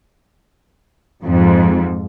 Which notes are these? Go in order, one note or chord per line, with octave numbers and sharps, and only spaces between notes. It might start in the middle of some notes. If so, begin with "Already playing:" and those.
F2 G#2